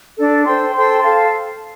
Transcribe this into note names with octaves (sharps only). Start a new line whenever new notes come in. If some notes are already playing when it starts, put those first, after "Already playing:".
D4 A4 D5
A4 C5 G5 C6
A4 C5 G5 C6
A4 F5 A5